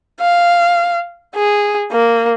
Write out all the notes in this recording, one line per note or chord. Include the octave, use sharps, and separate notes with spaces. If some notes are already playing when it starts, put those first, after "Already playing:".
F5
G#4
A#3